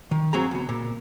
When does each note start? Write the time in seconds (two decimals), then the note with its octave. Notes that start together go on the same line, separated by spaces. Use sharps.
0.11 D#3
0.33 G2 F#3 C4 G#4 A#5
0.51 C#2 B3
0.69 A#2